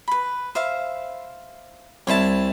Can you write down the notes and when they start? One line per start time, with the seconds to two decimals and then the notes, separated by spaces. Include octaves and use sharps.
0.08 B4 B5
0.55 C5 E5 F5
2.07 C2 E4 C5 C#5 A5